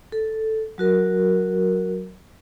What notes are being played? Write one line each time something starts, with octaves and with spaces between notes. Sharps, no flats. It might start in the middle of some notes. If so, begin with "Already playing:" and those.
A4
F#3 F#4 A#4